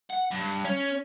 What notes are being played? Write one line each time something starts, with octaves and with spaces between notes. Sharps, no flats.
F#5
G2
C#4